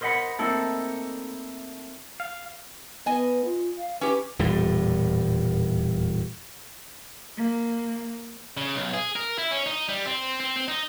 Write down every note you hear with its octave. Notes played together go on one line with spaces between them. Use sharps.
A#4 C5 D#5 E5 F#5 B5
A3 A#3 C4 D#4 E4 A4
F5
B3 D#5 G#5
F4
F5
C#4 G4 B4
D#1 E2 A2 G3
A#3
C#3
B1
G#4
A#4
E4
C#4
D#4
G3
C4
C4
C4
D#4